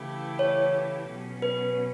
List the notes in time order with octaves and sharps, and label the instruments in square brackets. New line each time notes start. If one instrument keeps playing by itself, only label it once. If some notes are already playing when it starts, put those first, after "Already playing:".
Already playing: [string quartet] C#3 E3 A3 E4 G4
[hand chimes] C#5
[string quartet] B2 F#3 C#4
[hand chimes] B4